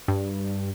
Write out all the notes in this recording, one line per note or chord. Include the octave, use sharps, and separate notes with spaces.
G2